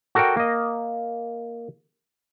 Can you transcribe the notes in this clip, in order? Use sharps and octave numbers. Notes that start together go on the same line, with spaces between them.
F#4 A4 A#4 D5 G5
A#3 D#5